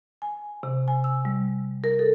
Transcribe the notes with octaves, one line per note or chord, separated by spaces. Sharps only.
G#5
C3
G#5
E6
G3
A#4
A4